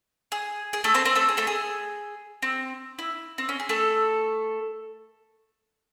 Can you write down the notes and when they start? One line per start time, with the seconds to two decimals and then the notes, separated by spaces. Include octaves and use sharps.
0.32 G#4
0.73 G#4
0.84 A3 A4
0.94 C4 C5
1.05 C4 C5
1.15 A3 A4
1.29 G#4
1.37 A3 A4
1.47 G#4
2.42 C4
2.99 E4
3.38 C4
3.49 C#4
3.60 G#4
3.69 A3 A4